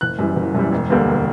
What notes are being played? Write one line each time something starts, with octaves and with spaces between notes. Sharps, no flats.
F#1 F#6
F#2 E3 G3
F#1
F#2 E3 G3
E1
D2 D3 G3 A#3
E1